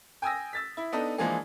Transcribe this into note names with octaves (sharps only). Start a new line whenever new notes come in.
G5 G#5 D#6 E6 A#6
E6 A6 B6
E4
B3 D4 D#4 A4
E3 F3 G#3 A#3 D4 G#4